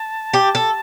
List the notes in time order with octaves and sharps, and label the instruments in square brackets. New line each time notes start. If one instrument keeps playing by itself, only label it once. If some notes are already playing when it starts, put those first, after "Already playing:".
Already playing: [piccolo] A5
[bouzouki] G4
A4